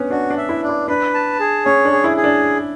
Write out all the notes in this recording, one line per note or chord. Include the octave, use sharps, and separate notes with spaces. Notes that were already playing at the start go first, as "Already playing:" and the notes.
Already playing: B3 C#4 D4
D4 F#4
D4
E5
E4
D4
E4
D4 B4
A5
G#4
C#4 C#5
D4
G#4
E4
G#4
D4